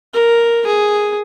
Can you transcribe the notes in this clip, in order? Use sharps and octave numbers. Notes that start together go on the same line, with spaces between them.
A#4
G#4